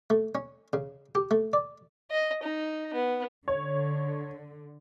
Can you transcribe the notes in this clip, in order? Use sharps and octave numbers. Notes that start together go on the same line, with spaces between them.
A3
C#4
C#3
G4
A3
D5
D#5
D#4
B3
D3 C#5